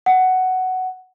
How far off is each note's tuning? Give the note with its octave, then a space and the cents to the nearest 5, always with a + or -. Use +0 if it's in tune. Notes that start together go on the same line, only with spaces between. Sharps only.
F#5 +10